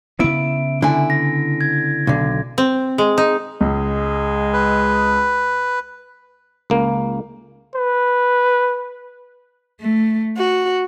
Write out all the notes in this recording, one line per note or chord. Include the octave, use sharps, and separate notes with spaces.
C#3 B3 E4 D7
D3 E4 G#5
A#6
G#6
B1 D3
C4
G#3
D#4
C#2 G#3
B4
C#2 A#3
B4
A3
F#4